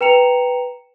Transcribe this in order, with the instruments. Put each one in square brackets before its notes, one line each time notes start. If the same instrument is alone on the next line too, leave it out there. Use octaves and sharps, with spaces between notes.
[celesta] B4 G5 A#5 C#7 E7 F7